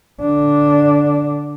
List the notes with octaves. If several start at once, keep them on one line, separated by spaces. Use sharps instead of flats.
D3 D4